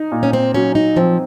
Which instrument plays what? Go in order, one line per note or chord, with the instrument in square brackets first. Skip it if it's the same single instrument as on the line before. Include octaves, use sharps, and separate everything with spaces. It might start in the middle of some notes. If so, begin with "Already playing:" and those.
Already playing: [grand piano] D#4
A#2
[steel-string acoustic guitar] C#4
C4
[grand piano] F#3 [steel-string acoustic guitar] C#4
[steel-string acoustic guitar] D#4
[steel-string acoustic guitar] F3 [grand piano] C4